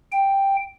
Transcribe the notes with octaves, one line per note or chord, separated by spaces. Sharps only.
G5